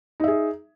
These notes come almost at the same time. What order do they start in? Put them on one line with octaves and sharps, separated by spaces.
D#4 E5 G#4